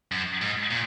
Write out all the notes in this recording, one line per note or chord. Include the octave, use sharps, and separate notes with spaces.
F#2
G#2
A#2